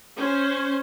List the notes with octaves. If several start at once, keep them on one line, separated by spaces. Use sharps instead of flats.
C#4 C5